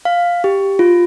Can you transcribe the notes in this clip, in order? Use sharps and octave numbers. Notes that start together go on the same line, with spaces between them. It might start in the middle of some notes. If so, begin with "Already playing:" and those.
F5
G4
F4